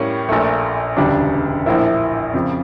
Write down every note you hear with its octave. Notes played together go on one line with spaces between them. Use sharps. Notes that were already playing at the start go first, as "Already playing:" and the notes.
Already playing: A2 G3 A#3 C#4
A#1 A#2 A3
E1 D2 C#3 G3 D4
A#1 A2 F3 A#3 E4
F2 C#3 F3